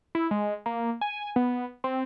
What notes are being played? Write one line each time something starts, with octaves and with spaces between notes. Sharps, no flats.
E4
G#3
A#3
G#5
B3
C4